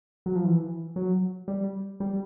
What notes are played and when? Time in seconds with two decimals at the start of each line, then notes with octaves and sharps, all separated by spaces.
0.26 F#3
0.35 F3
0.45 E3
0.96 F#3
1.48 G3
2.00 G3